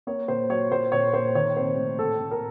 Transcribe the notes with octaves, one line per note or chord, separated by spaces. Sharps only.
A#3 C#5
A#2 C5
F#3 C#5
A#2 C5
A#2 C#5
A#3 C5
D#3 C#5
C3 C5
A3
A2 A4
A2
A#4